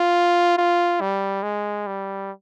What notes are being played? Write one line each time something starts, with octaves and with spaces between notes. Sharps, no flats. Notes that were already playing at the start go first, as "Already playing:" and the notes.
Already playing: F4
F4
G3
G#3
G3